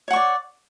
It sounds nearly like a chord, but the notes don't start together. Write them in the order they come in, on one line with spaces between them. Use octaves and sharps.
C#5 F#5 C#6 D5